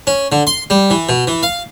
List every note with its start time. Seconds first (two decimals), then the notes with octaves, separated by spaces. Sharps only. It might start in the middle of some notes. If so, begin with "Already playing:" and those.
0.07 C#4
0.32 D3
0.47 C6
0.70 G3
0.90 E3
1.09 B2
1.27 E3
1.43 F5